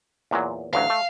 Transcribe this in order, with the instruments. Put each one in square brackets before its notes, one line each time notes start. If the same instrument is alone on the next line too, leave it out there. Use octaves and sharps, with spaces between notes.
[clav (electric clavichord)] E2 A#2 F#3
[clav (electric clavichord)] A1 D2 F#3 [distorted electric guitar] F5
[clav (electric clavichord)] A3